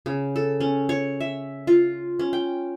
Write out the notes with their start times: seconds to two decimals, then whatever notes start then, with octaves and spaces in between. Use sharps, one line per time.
0.06 C#3
0.36 A4
0.60 C#4
0.89 C#5
1.20 E5
1.67 F4
2.19 C#4
2.33 G5